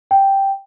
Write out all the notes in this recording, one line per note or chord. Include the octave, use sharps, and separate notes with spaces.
G5